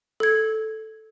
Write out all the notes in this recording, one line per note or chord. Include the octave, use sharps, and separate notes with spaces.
A4 G#6